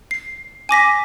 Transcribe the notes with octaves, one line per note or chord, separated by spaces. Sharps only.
C7
G#5 D6 A#6 B6